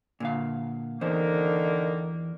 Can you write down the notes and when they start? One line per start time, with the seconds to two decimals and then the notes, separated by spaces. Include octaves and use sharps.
0.20 A#2 D3 F5
1.01 E2 D3 D#3 A#3 C5